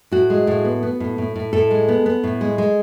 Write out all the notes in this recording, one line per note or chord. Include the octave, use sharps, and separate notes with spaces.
A2 F#4
G#3
A2
B3
B3
A2
A2
A2
A2 A4
G#3
B3
B3
A2
G#3
G#3